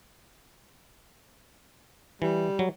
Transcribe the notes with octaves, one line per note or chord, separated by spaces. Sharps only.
E3 G3
F#3